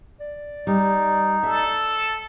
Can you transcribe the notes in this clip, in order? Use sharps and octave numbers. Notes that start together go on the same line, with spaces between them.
D5
G3 D#4
A4 E5